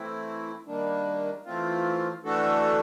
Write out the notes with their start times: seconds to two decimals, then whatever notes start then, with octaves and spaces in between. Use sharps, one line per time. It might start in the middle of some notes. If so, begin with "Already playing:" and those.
Already playing: E3 A3 C4 E4
0.66 D#3 G3 A#3 D4
1.45 E3 A3 C4 F4
2.23 E3 A3 D4 F#4 A4